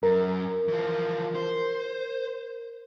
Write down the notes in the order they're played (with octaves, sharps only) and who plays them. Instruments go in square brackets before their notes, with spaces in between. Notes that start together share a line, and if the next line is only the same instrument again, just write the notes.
[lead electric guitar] F#2 [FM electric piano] A#4
[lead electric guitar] E3 F3
C5